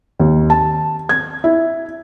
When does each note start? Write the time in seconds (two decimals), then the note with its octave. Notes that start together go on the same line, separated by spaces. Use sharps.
0.19 D#2
0.50 A5
1.09 G#6
1.44 E4